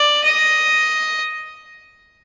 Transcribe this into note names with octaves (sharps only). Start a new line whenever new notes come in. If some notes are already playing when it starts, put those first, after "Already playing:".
Already playing: D5
D#5